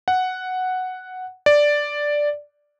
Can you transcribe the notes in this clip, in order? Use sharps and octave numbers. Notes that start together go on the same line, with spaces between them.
F#5
D5